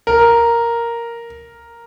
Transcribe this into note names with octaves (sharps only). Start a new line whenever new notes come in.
A#4